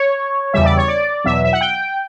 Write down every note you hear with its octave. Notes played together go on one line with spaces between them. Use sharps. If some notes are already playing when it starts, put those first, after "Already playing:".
Already playing: C#5
E2 C#3 G3 E5
D5
C#5
D5
E2 B2 F#3 E5
E5
F#5
G5